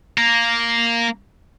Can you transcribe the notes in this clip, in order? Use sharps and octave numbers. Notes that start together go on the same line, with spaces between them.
A#3